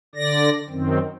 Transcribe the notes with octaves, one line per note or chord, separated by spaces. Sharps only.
D3 D5 A#6
F#2 D#3 C4